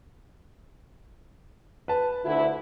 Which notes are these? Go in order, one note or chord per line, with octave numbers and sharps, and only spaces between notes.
B4 A5
D2 D3 E4